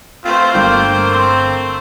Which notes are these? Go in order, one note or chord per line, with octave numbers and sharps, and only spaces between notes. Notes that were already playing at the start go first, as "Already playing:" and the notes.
A3 C4 F4 C5
G1 D3 A#3 A#4 G5
C4